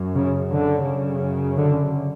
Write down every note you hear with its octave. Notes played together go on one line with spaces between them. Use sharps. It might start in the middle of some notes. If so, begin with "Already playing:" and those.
Already playing: F#2
C#3
D3
F#2 C#3
D3